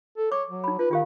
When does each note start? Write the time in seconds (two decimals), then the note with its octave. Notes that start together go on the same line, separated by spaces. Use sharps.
0.18 A4
0.32 C#5 D6
0.48 F#3
0.64 D#4 B5
0.79 F4 B4
0.91 D#3 F4 G4 F5